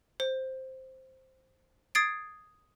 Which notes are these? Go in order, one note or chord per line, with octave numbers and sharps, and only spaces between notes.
C5
D#6 G#6 A6 C7 D7